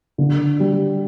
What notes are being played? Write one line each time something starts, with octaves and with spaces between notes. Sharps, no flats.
D3
G3